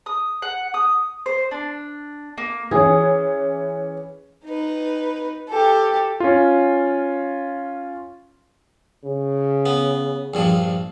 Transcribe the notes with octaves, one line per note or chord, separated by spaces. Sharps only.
D#6
F#5
D#6
C5
D4
A#3
E3 C#4 G#4
D#4 B4
G4 A4
C#4 F4
C#3
B3
A#1 G2 F3